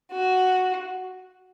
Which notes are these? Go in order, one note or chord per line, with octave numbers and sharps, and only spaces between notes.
F#4